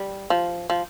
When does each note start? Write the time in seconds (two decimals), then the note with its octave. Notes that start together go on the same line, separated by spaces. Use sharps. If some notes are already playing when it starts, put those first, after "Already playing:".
Already playing: G3
0.30 F3
0.70 F3